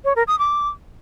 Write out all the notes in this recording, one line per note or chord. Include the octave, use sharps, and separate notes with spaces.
C#5
A#4
D#6
D6